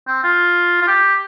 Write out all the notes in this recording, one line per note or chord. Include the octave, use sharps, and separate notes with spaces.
C4
F4
F4
G4